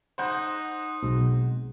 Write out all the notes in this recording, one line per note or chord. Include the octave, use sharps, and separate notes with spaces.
D#4 C5 F#5 G6
B1 B2 G#3 C4